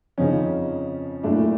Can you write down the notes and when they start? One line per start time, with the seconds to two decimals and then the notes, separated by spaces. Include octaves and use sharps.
0.18 F2 C#3 F3 C#4 D#4
1.23 A#2 F#3 A3 D4 E4